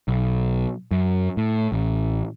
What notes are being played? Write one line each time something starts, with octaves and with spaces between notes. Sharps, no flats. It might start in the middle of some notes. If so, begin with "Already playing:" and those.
B1
F#2
A2
A1